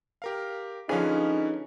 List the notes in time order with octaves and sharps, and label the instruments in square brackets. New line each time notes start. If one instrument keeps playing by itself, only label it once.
[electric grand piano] G4 A#4 F5
[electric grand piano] D3 C#4 B4 [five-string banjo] F3 G#4 [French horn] D#4